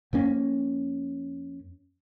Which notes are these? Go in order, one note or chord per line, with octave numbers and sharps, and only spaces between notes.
F2 A#3 C#4